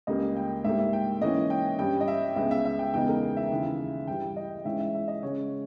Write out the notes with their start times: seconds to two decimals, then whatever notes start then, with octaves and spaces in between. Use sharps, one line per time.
0.07 C#2 C#3 G3 A#3 D#5
0.36 G5
0.64 G#2 G3 A#3 E5
0.79 E5
0.93 G5
1.21 G#2 E3 A#3 C#4 D#5
1.50 G5
1.79 G2 G3 C#4 G5
2.01 D#5
2.08 E5
2.36 C#2 C#3 G#3 B3 E5
2.51 E5
2.65 E5
2.79 G5
2.94 E2 C#3 G#3 B3 D#4 G5
3.09 A#4
3.22 G#4
3.37 E5
3.51 D#2 C#3 E3
4.07 G2 E3 G3 G5
4.36 D#5
4.65 G#2 E3 G#3 C#4 E4 E5
4.80 E5
4.94 E5
5.08 D#5
5.22 C#3 G#3 C#4 C#5